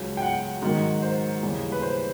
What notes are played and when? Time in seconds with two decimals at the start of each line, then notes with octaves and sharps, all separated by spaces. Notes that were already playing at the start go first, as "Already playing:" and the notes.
Already playing: C#2 C#3 F#3
0.17 G5
0.22 F#5
0.62 G#2 D#3 F#3
1.02 C5
1.42 D#2 C#3 E3 G3
1.72 B4
1.82 C5